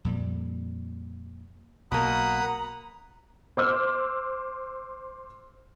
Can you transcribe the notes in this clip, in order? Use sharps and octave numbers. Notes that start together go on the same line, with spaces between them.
F2 A#2 G3
B1 B2 A#3 F#5 A#5 B5 D#6
C5 D6 E6 F6